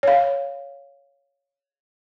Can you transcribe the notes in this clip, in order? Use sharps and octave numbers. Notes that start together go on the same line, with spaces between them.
C#5 F5